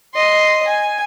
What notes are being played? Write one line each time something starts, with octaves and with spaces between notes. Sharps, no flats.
D#5 C6
G#5